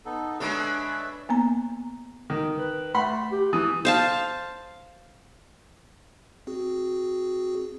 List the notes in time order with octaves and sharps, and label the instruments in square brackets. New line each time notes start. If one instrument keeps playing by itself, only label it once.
[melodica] B3 D#4 A4
[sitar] G#3 D4 A4 [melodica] B4 C#5 E5
[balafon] A#3 B3 A#5
[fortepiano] D#3
[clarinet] B4
[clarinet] A3 [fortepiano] F#5 B5 C6
[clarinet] G4
[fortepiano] E3 [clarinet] D#6
[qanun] C5 F5 A5
[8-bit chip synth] C4 F#4 G#4